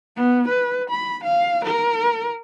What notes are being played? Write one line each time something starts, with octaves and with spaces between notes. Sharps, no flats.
B3
B4
B5
F5
A#4